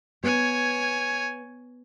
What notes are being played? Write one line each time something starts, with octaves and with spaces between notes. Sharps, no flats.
B3 C#5 G#5